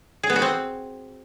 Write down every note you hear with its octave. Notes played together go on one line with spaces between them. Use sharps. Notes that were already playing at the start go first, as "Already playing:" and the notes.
G#4
B3
F#4
C4